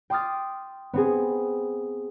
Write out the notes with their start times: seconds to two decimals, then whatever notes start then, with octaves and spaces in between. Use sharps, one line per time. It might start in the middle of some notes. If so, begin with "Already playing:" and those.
0.10 G5 C6 D6 D#6 F6 A6
0.94 B3 C4 G#4